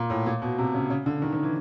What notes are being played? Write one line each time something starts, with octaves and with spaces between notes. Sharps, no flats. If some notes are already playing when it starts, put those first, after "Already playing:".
Already playing: A#2
A2
A#2
B2
C3
C#3
C#3
D3
D#3
D#3
E3